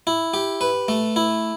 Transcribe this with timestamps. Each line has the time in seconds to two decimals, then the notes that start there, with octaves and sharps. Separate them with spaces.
0.07 E4
0.34 G4
0.61 B4
0.88 A3
1.16 E4